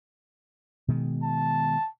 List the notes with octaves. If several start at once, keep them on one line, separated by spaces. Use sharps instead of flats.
B2 D#3 G#3
A5